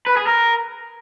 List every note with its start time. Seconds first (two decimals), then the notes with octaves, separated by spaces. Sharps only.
0.07 B4
0.17 G#4
0.27 A#4